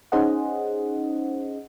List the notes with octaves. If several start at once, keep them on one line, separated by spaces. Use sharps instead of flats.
C#4 D#4 G#4 C5 D#5 F#5